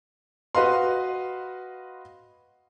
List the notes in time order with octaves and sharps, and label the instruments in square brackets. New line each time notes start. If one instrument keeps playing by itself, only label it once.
[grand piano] F#4 B4 D#5 F5 C6